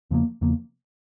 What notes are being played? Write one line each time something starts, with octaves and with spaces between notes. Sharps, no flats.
E2 C#3 F3 A#3
E2 C#3 F3 A#3